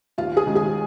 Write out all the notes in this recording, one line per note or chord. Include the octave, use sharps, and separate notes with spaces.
D#2 F4 F5
G#4 G#5
D#3 G#3 C#4
G#4 G#5